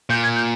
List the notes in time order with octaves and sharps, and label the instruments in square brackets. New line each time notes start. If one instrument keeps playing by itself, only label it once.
[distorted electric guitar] A#2 [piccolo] G6
[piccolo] G#6
G6